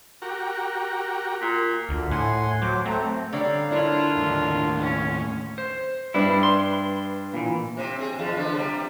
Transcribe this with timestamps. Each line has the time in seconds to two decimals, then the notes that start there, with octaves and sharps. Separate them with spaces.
0.22 F#4 G4 A#4
1.41 A#2
1.89 D2
2.11 A2 F#5 G#5 C6
2.62 F#3 C5 D6
2.86 A3 C4 A#5
3.33 D3 G3 C#5 F5 A#5
3.72 D4 E4 F4 A#4 C#5
4.17 D#2 A2
4.80 C#4
5.58 C5
6.14 G2 D4 E4 B4
6.43 C6
7.34 A#2 E3
7.77 C3 C4
7.96 C4 G#4
8.19 E2 F3
8.37 D3 B3
8.56 C3 G3